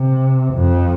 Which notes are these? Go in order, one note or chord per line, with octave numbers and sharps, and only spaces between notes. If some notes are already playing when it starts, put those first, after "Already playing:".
Already playing: C3
F2